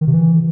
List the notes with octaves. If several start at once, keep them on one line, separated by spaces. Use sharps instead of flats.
D#3
C3
E3